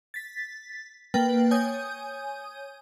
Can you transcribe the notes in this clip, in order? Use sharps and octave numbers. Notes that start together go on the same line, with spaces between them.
A6 B6
A#3 B4 G5 A6
C#5 G#5 D#6 G6